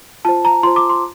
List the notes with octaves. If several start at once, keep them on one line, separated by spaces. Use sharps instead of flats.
F4 C5 A5
A#5
F4 C5 C6
D6
C6